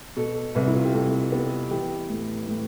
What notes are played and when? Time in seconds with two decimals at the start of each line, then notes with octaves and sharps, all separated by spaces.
0.16 B2 A4
0.55 C2 B4
0.67 E4
0.76 F4
0.85 G4
0.93 C2 A4
1.32 B3 G4
1.71 E3 G4
2.09 A2
2.47 A2